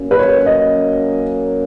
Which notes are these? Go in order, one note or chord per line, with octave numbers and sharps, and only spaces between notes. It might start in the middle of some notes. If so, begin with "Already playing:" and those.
Already playing: F#3 A#3 C#4
B4
C#5
D#5